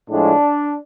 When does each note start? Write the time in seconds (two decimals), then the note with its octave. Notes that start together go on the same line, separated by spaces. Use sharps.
0.10 A2 F3 G#3 D4